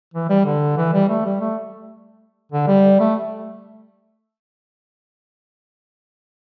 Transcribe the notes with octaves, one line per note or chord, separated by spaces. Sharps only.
E3
G3
D3
E3
G3
A3
G3
A3
D3
G3
A3